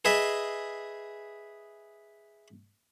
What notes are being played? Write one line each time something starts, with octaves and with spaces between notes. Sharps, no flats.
G#4 B4 D#5 E5